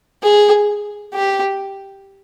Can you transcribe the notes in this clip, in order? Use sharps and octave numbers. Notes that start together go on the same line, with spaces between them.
G#4
G4